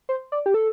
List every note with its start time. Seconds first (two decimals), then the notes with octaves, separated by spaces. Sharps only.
0.09 C5
0.32 D5
0.46 G4
0.54 A4